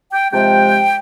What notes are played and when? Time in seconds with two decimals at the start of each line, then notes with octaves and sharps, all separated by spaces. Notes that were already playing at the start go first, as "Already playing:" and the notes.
0.12 G5
0.32 C3 F3 G#3 G5